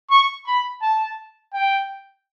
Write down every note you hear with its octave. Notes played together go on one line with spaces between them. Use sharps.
C#6
B5
A5
G5